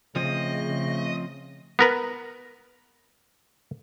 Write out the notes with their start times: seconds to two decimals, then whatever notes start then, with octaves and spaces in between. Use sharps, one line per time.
0.16 C#3 F3 A3 C4 D#5
1.79 B3 A#4 B4